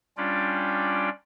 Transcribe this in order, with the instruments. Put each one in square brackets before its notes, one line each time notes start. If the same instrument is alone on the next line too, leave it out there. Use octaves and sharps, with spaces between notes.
[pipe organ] G3 C#4 D4 F4 D5 G5